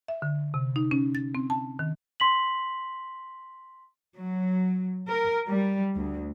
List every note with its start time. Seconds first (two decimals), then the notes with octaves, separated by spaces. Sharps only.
0.08 E5
0.22 D3
0.54 C3
0.76 D#4
0.91 C#4
1.15 A6
1.35 C4
1.50 A5
1.79 D#3
2.20 C6 B6 F#7
4.16 F#3
5.07 A#4
5.46 G3
5.95 D2